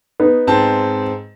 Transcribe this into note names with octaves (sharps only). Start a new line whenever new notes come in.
B3 D#4
G#2 C4 A5